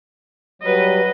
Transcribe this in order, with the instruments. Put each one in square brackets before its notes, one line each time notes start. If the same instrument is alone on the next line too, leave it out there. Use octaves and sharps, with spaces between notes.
[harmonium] F#3 G3 [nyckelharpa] B4 D#5